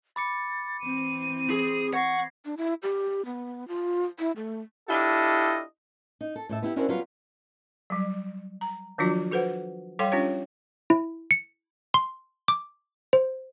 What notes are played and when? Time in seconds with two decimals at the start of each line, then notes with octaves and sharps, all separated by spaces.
0.16 B5 D6 A6 C#7
0.80 E3 C4 D#7
1.50 G#4
1.93 F#5 C#6 G#6 A#6 C7
2.45 D4
2.57 E4
2.83 G4
3.25 B3
3.68 F4
4.19 E4
4.36 A3
4.89 D4 E4 F4 G4 A4 D#5
6.21 D#4
6.36 A4
6.49 A2 A4 E5
6.62 B3 E4 G4
6.76 C#4 D4 E4 F#4 A#4 C5
6.89 F#3 G3 B3 F4 B4
7.90 F#3 G3
8.61 A#5
8.98 D#3 F3 F#3 D4 F4 F#4
9.31 F#4 A4 B4 C5 F#5
9.99 G3 A4 C#5 F5 G5 C6
10.12 C#4 D4 F4 G4 C#5
10.90 E4
11.31 C#7
11.94 C6
12.48 D6
13.13 C5